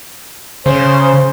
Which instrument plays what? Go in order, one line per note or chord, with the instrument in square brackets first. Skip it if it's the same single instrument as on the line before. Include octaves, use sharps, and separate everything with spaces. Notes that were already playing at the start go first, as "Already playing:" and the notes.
[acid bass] C#3 [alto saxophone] C5